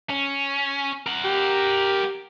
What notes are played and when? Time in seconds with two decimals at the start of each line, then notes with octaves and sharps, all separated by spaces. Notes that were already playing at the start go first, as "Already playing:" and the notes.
0.10 C#4
1.06 A#4 F#5
1.24 G4